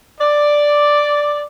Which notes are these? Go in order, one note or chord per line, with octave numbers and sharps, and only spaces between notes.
D5